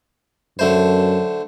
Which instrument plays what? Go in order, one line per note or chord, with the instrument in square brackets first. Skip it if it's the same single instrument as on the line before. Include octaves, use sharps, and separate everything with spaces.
[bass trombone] F#2 [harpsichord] D3 A3 C5